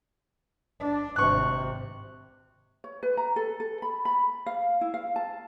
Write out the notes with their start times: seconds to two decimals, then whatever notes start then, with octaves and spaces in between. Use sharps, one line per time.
0.80 D4
1.16 G#1 C3 C#6 F#6
2.84 C#5
3.03 B4
3.17 A#5
3.36 A4
3.60 A4
3.82 B5
4.05 B5
4.46 F5
4.81 E4
4.94 F5
5.16 A5